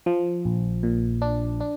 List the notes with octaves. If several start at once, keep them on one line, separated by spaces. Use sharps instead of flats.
F3
A#1
A#2
D4
D4